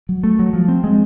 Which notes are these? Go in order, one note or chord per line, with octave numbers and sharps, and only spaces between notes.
F#3
A3
F#3
F3
C4
G#3